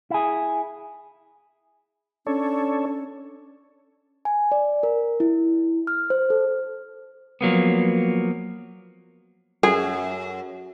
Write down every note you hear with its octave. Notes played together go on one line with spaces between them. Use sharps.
E4 G#4
C#4 D4 A4 C#5
G#5
D5
A#4
E4
F6
C5
A4
F3 F#3 A#3 B3
F#2 G#4 A4